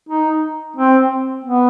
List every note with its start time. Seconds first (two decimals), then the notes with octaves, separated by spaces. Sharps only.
0.09 D#4
0.76 C4
1.44 B3